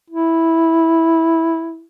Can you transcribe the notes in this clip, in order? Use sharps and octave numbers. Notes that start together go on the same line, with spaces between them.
E4